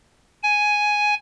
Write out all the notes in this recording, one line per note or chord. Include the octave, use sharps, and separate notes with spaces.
G#5